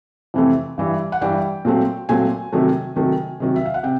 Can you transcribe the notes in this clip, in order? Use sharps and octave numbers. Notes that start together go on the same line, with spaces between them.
F2 C3 E3 A3 C4
G2 E3 G3
F#5
G2 E3 G3 G5
A#2 F#3 A3 C4
A#2 F#3 A3 C4 G#5
C3 D#3 F#3 A3
C3 D#3 F#3 A3
C3 D#3 F#3
E5
F5
F#5
C3 G5